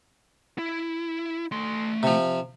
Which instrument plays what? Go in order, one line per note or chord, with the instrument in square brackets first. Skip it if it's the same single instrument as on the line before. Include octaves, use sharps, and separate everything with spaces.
[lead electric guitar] E4
A3 C6
[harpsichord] C3 F3